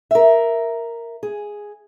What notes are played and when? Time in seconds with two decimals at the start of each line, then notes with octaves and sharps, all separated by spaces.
0.11 A#4 E5
1.23 G#4